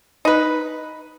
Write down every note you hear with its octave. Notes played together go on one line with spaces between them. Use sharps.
D#4 B4